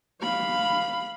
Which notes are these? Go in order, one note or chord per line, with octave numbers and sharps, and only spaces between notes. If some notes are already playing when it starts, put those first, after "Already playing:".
F5 B5